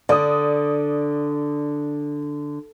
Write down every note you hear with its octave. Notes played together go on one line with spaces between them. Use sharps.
D3 D5 D#6